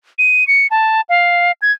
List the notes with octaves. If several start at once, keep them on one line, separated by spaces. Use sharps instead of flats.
D#7
C#7
A5
F5
G#6